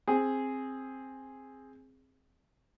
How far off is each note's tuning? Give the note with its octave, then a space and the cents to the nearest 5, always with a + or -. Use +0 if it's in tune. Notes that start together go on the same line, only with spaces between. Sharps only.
C4 +10 G#4 +0